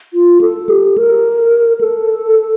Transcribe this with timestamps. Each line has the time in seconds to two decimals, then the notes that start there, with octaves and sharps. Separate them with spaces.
0.14 F4
0.41 A4
0.69 G4
0.98 A#4
1.81 A4